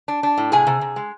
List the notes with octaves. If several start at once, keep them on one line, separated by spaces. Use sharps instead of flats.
D4
D4
A2
C3 G#4 G#5
C3
C3
G#3